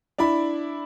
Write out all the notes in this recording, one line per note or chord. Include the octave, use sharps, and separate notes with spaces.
D4 E4 D5 B5